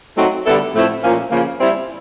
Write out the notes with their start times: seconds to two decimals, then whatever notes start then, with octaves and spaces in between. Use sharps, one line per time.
0.17 F#3 A3 C4 D#4 F#4
0.45 D3 G3 B3 E4 A4
0.74 A2 F3 A3 C4 E4
1.03 A#2 F3 A#3 C#4
1.31 C#3 F3 A#3
1.60 G3 C4 E4